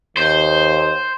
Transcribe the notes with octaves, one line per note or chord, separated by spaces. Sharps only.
D#2 C5